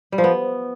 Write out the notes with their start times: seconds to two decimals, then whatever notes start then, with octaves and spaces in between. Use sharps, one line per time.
0.12 G3
0.18 F3
0.24 B3